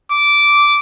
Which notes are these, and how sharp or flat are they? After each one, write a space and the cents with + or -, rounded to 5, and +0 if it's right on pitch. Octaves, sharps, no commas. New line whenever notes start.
D6 -10